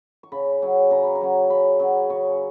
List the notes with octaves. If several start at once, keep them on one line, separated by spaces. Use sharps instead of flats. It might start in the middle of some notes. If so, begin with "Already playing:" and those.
C#6
C#3 B5
F#3 C#4
C#3 A#5
B5
A#5
F#3 C#4
C#3 B5
F#3 C#4
C#3 C#6